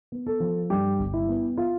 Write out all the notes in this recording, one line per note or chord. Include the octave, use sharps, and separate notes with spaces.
B3
A4
F3
G2 G4
G1
E4
B3
F4